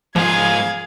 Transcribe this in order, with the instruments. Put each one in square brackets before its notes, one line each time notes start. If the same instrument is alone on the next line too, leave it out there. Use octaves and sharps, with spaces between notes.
[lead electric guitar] G#2 F4 [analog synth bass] F3 [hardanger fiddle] G#4 F5 [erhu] G#6